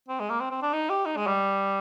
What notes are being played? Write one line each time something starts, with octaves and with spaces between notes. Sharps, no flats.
C4
G#3
A#3
C4
C4
D4
D#4
G4
D#4
G#3
G3